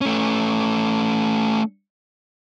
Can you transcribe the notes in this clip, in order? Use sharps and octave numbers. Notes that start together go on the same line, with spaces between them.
A3 C#4